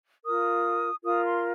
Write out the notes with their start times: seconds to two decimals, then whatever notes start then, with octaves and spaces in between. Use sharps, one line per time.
0.25 F4 A#4 D#6
1.04 F4 A#4 D#6
1.24 C6